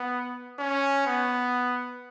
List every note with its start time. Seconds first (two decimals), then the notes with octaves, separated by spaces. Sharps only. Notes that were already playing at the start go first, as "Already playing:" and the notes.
Already playing: B3
0.59 C#4
1.07 B3